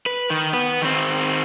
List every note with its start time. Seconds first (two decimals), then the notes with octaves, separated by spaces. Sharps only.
0.06 B4
0.30 D#3
0.53 B3 B4
0.81 D#3 C4